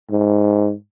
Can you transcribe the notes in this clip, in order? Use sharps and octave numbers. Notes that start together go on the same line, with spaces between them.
G#2